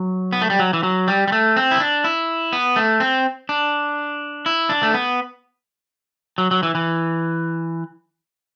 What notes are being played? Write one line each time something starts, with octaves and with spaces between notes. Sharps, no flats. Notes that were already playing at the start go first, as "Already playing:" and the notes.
Already playing: F#3
B3
A3
G3
F#3
E3
F#3
G3
G3
A3
C4
E4
D4
E4
B3
A3
C4
D4
E4
D4
A3
B3
F#3
F#3
E3
E3